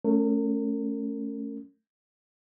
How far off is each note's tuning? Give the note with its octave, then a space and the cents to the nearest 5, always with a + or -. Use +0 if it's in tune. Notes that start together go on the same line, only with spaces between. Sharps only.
A3 +0 C#4 +0 A#4 -35